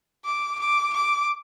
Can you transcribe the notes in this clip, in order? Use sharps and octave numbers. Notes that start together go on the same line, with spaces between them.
D6
D6
D6